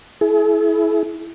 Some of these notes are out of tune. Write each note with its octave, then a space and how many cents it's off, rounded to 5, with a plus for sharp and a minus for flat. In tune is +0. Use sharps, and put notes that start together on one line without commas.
E4 +0 G#4 +45